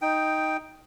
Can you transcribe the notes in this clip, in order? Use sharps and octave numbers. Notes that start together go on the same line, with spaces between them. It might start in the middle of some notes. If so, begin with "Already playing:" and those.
D#4 G5